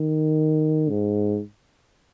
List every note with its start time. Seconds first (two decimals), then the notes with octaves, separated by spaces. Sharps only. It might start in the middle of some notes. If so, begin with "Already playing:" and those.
Already playing: D#3
0.89 G#2